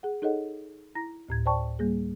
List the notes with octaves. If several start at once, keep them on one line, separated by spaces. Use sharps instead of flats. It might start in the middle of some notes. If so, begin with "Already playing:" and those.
G#4 F#5
D#4 G#4 A4 C#5 D#5 F#5
E4 A#5 A#6
D2 A2 G#6
C5 D5 G5 A5 C#6
G3 A#3 G#4